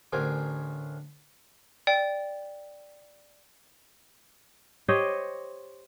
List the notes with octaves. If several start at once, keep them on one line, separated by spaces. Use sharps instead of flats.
A1 D2 A#4 C5 G#5 D6
D5 G5
G4 C5 C#5 D#5